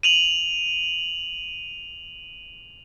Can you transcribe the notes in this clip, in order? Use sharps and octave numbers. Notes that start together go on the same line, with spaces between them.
D#7 F7 F#7